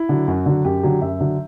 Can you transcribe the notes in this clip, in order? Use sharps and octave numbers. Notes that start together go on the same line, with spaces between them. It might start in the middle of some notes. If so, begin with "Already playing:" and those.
Already playing: E4
D3 F#3
F#2 F#4
D3 F#3
F#2 G4
D3 F#3
F#2 E5
D3 F#3